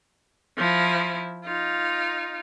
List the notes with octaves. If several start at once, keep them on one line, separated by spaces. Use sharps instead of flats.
F3 E4
D#4 F4